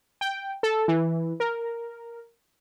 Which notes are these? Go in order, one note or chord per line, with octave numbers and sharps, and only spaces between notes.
G5
A4
E3
A#4